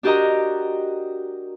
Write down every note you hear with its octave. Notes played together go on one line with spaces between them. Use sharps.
D4 F#4 G4 A#4 D#5 A#5